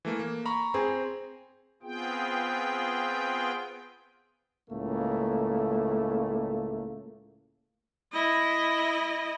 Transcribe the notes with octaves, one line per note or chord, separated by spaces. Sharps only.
E3 A3 A#3
A#3
A#5 B5 C#6
C4 G#4
B3 C4 F4 G#4 G5
C#2 A2 A3 A#3
E4 D#5